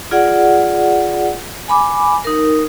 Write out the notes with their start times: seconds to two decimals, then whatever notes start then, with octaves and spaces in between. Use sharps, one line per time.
0.11 F4 G#4 D5 F#5
1.68 G#5 B5 D6
2.24 D#4 A#4